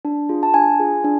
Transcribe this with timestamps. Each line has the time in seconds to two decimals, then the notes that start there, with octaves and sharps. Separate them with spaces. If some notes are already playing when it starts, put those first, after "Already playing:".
0.05 D4
0.29 F4 G#4
0.43 A5
0.54 D4 G#5
0.79 F4 G#4
1.04 D4